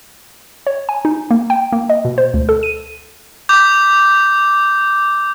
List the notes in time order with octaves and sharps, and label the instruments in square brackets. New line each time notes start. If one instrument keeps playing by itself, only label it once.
[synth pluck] C#5
G#5
D#4
A#3
G5
A#3
D#5
B2
C5
D2
A4
D#7
[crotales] D6 G6